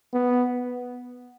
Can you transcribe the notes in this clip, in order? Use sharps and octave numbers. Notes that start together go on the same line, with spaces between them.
B3